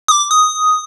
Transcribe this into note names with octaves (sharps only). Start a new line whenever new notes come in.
D#6
D6
D#6